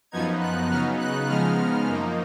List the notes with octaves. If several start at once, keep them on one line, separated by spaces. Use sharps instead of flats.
F#2 F3 B3 D#4 G#6
F#6
C#3 F#3 B3 D#4 F6
F#6
C#3 F3 G#3 B3 D#4 F6
F#2 F3 A#3 D#4